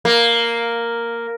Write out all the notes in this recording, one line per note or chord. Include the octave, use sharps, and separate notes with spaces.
A#3